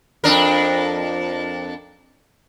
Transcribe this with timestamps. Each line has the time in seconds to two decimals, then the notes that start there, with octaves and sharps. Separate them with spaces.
0.24 F2 D4 A#4